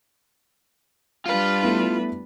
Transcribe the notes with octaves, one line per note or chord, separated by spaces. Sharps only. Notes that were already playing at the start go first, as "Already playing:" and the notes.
G3 D4 F4 B4 F5
A3 B3 E4